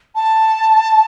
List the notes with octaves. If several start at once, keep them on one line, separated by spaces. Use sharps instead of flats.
A5